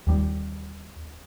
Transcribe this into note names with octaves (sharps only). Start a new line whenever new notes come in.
D#2 G3